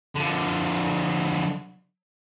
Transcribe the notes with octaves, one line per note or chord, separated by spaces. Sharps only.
D3 F3